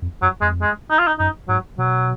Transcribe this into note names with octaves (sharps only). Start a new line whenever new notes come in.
F2
F#2 F#3
F2 G#3
G#3
D#4
F4
D#4
F#2 D#4
G#2 F#3
B2 F#3